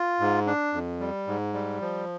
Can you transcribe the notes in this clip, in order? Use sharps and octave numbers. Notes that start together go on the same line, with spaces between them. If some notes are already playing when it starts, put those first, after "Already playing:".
Already playing: F4
G#2
D4
F2
G3
G#2
G3
F3